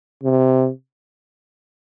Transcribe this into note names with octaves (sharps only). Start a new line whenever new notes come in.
C3